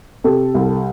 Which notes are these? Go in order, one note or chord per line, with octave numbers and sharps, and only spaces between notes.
C3 G4 A4
C2